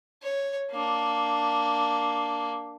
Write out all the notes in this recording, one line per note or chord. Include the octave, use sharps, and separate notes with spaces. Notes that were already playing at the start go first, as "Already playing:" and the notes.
C#5
A#3 D4